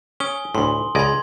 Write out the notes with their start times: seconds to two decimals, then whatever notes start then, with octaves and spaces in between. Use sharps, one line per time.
0.20 C#4 G#5 D#6 G7
0.55 D2 A2 C6
0.95 C#2 D5 D#5 B5 C6 G#6